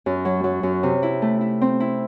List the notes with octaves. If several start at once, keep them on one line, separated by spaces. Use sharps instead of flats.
F#2
F#3
F#3
F#2
C3
E4
A3
E4
C4
E4